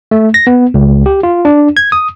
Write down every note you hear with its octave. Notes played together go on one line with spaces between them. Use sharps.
A3
A#6
B3
C#2
G4
F4
D4
G#6
D#6